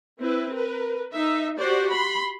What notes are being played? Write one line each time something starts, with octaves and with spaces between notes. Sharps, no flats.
C4 E4 B4
A#4 B4
D#4 E5
F#4 G4 C5 D5
B5 C6